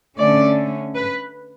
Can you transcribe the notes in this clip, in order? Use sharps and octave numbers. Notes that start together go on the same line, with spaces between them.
D3 A3 C#4 D5
B4